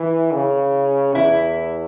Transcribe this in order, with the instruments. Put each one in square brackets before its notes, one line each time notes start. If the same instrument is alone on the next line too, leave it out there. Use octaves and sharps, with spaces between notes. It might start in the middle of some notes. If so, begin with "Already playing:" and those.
Already playing: [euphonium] E3 [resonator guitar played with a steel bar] E4
[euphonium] C#3
[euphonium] E2 [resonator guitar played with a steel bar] E4